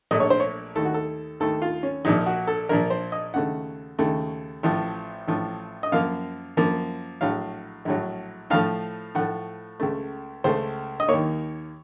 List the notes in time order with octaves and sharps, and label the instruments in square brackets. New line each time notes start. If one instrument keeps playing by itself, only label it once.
[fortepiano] A#1 A#2 A3 D#5
C#5
C5
C#5
D#2 D#3 A3 A4
F#4
A4
D#2 D#3 A3 A4
F4
C#4
A#1 A#2 F3 D#4
F#4
A4
A#1 A#2 F3 A#4
C5
D#5
D#2 C#3 A3 F#5
D#2 C#3 A3
A1 A2 F3
A1 A2 F3
D#5
F#2 F3 A#3 F5
F#2 F3 A#3
A#1 A2 F#3 F5
A#1 A2 F#3
A2 F3 A3 F5
A2 F3 A3 F#5
C#2 C#3 A3
C#2 C#3 A3 C5
D#5
D#2 D#3 A#3 C#5